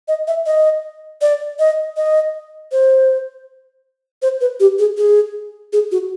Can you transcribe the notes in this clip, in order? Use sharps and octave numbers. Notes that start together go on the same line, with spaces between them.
D#5
E5
D#5
D5
D#5
D#5
C5
C5
B4
G4
G#4
G#4
G#4
F#4